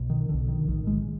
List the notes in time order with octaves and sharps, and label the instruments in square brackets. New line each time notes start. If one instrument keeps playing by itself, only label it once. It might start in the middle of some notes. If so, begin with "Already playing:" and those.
Already playing: [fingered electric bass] B1 B2
D#3
B1 B2 D3
D#3
A#1 A2 D#3
G#3